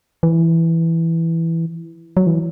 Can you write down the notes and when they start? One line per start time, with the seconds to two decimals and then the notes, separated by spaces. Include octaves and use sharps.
0.23 E3
2.17 F#3
2.27 E3